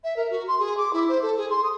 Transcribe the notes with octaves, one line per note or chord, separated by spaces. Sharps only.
E5
A#4
F#4
C6
G#4
D6
E4
C5
A4
G#4
C6
D#6